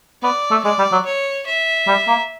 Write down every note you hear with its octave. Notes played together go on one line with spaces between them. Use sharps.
B3 D5
A3
G#3 D5
G3
F#3
C#5
E5
G3
A#3